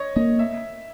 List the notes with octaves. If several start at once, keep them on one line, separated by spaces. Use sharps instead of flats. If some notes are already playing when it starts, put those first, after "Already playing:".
Already playing: C#5 D#5
A#3 D#5
E5